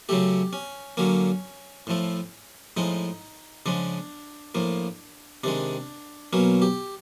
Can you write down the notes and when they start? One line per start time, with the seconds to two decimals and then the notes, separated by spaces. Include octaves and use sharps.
0.09 C#3 F#3 A3 G4
0.53 C#4
0.97 D3 F#3 A#3 C#4
1.87 A2 F3 A3
2.77 A2 F3 G#3 D#4
3.66 C#3 F3 G#3 D4
4.55 A2 F3 A#3
5.44 C3 D#3 G#3 D4
6.33 B2 F#3 A#3 C#4
6.62 G4